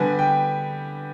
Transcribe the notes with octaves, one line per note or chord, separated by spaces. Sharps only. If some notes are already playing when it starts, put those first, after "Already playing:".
Already playing: D3 G3 B3 G#5
G5